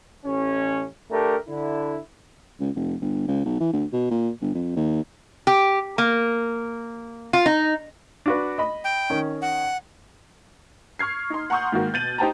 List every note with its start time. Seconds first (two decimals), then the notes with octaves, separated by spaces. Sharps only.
0.25 A1 C#4
1.11 A3 D4 G4 A#4
1.48 D3 E4
2.60 C#2
2.76 F1
3.01 G1
3.28 C#2
3.45 B1
3.60 E3
3.73 D2
3.93 B2
4.11 A#2
4.42 G1
4.54 F2
4.76 D#2
5.47 G4
5.98 A#3
7.33 F4
7.46 D#4
8.26 D4 F#4 B4
8.58 D#5 B5
8.84 G5
9.10 D#3 C#4
9.42 F#5
10.99 C#6 F6 G#6 C7
11.30 D#4 C6
11.50 F#5 A#5 C6 C#6 D#6 G6
11.72 G#2 D#3 A#3 F#4
11.93 B2 G6 A6 D#7 F#7
12.18 D#4 G4 C5 G5 A5 A#5